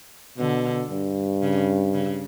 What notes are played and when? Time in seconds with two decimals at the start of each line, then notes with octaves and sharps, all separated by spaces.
0.38 B2 D3
0.90 G2
1.42 C#3
1.93 C#3